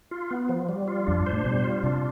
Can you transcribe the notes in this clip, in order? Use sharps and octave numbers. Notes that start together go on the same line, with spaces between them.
F4
B3
F3
G3
F4
F2 D4
G2
C5
A2
B2 G3
F4
C3 D4